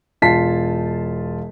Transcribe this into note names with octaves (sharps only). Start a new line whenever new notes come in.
E1 F4 A5 B6 C7